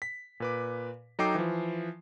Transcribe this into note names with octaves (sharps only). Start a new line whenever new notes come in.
B6
A#2 B4 D6
F#3 D#4 A4 G5 D6 C7
E3 F3